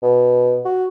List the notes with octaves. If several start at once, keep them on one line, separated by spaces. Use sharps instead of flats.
B2
F#4